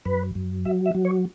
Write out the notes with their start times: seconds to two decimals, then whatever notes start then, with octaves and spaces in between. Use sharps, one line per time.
0.05 F#2 B4
0.35 F#2
0.65 F#3 E5
0.86 E5
0.95 F#3
1.05 C#5